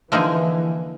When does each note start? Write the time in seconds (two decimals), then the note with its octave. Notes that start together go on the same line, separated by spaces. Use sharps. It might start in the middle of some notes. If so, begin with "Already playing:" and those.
0.12 D3 E3 F3 A#3 D#4 G#4